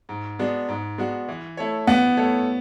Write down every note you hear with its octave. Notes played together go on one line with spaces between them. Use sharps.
G#2
G#3 B3 D4 F#4
G#2
G#3 B3 D4 F#4
E3
A3 E4 A4 C#5
E3 B3
A3 E4 A4 C#5